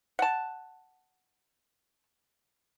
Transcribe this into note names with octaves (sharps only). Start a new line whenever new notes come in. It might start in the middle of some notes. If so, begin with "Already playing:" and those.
F#5 A5